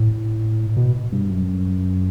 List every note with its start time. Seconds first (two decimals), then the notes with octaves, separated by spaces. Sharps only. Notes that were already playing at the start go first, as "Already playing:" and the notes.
Already playing: A2
0.77 B2
1.12 G2
1.30 F#2